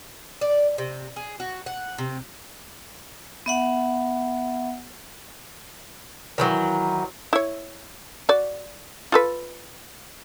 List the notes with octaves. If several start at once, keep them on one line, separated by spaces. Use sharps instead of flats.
D5
C3
G#4
F#4
F#5
C3
B3 E5 F#5
D#3 E3 F#3
E4 C#5
F#4 D5
F4 A4 B4